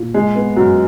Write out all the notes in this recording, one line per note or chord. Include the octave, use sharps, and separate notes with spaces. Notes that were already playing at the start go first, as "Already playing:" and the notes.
Already playing: A#2
G#3
B3
F#2